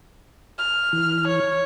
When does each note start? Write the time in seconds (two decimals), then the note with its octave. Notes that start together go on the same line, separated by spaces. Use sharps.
0.58 F6
0.93 E3
1.28 C#5